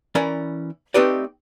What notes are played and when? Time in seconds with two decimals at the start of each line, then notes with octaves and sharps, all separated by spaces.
0.15 E3 C#4 A#4 D5 B5
0.94 A3 C4 D#4 G4 B4 D5